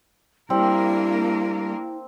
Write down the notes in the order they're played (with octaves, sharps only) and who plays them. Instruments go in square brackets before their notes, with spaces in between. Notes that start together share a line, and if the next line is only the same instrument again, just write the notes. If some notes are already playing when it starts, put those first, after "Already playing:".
[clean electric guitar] G3 [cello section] A#3 D4 A#4 [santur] C4 [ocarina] E4